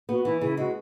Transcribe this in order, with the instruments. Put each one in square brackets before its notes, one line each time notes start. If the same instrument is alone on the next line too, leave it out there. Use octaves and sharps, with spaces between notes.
[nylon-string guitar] B3 [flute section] F#4
[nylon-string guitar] E3 [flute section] E4
[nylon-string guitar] C#3 [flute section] E4
[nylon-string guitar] G#3 [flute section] F#4